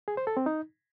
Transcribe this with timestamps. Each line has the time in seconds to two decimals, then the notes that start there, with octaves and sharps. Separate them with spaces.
0.08 G#4
0.17 C5
0.27 A4
0.37 C4
0.46 D#4